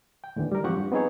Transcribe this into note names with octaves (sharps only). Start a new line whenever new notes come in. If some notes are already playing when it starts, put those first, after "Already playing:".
G5
D#2 A2 D3 E3
G3 A#4
G#2 F3 C4 G4 F#5 C#6
G2
B3 C4 D#4 G#4 C#5